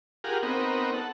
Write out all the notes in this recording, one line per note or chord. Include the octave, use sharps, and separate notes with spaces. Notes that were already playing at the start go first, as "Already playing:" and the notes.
F4 G4 G#4 A#4 F#5
B3 C4 D#4 F#4 A#4
A4 F#5